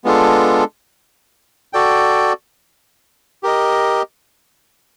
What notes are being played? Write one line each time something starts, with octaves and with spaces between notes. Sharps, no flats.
G#3 B3 D4 F4 A4
F#4 A4 D5 G5
G4 A#4 D#5